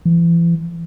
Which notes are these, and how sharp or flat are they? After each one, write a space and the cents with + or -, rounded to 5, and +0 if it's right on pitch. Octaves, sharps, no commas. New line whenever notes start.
E3 +40